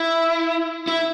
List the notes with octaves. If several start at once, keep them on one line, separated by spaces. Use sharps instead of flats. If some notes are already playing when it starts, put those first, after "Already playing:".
Already playing: E4
E4